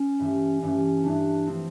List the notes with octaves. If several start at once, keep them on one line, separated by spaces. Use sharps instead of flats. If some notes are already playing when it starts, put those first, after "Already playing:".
Already playing: C#4
G2 E3 A3
G2 E3 A3 C#4
G2 E3 A3 D4
F3 A3 C4